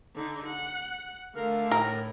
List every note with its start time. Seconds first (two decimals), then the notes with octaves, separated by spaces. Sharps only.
0.16 D3 D#4
0.46 F#5
1.35 D3 A3 A#4 F5
1.72 A2 A#4